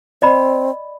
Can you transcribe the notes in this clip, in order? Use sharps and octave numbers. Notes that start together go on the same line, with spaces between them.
C4 D5 D#5 B5